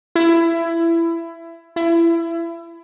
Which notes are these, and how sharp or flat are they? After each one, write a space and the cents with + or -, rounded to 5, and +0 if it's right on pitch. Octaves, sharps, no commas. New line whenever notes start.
E4 +20
E4 +25